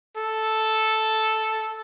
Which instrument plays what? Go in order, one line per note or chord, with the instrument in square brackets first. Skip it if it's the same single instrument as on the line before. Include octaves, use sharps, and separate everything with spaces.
[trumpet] A4